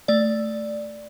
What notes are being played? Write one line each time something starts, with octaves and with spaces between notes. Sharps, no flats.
A3 D5